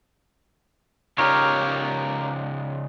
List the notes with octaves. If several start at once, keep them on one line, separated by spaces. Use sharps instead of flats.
C#3 D#4 F4 G4 A#4 C#5